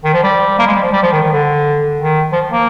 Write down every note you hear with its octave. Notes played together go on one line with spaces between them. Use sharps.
D#3
F3
G3
A#3
G#3
G3
F3
G3
F3
D#3
D#3
D3
D#3
F3
A#3